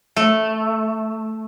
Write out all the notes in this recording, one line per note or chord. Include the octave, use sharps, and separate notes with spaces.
A3